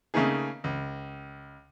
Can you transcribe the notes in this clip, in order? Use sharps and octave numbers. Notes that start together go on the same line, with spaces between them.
C#3 A3 A#3 D#4 G#4
C#2